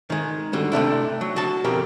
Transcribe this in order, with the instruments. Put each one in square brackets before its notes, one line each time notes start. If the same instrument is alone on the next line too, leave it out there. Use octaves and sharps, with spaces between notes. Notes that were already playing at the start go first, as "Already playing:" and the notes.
[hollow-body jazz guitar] D#3 G#3
D3 G3 F#4
C3 A3 D4 E4
F#3
F#4 A5
F2 B2 G4 A#4